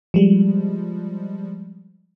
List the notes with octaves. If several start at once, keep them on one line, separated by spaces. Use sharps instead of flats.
F3 G3 G#3